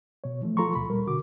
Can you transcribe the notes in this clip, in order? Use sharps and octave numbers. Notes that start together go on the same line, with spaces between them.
B2 C#5
E3 F3 A3
F3 F4 A4 A#5 C6 C#6
D2 B2 B5
A#2 G3 A#4
B2 D3 F#4 D6